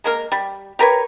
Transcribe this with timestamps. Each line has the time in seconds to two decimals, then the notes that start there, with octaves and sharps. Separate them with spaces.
0.04 G#3 A#3 A#4
0.32 G3
0.79 G4 A#4 B4 C#5